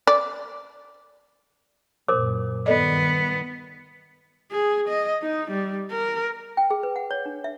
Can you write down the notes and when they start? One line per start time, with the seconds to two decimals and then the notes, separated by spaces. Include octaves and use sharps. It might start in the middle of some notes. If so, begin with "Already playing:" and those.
0.07 D5
2.08 F#2 A#2 A#4 C5 D6
2.66 G2 D#3 B3 A4 D5 D#5
4.52 G#4
4.88 D#5
5.22 D#4
5.50 G3
5.91 A#4
6.57 G5
6.71 G#4
6.83 B4
6.96 F#5
7.11 C#5
7.26 D4
7.44 E5